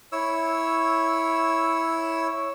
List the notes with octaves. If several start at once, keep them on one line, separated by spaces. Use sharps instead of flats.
E4 C#5 E6